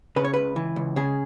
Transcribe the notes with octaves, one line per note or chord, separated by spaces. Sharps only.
C#3 B4
C#5
C#2 B4
E3
C#2
C#3 G#4